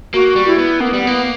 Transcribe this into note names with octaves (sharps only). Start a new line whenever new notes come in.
A#3 F#4
G3
E4
B3
A#3 B3
G3
A#3 B3